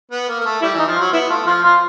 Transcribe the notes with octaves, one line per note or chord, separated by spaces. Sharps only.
B3
A#3
A#3
A3
G3 E4
E3 D#4
F3
F4
F#3
B3 E4
A3 F4
F3 F4
F3 F4